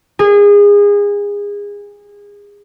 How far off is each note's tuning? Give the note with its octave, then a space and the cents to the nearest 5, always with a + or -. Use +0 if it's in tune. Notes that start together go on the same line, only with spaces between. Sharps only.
G#4 -25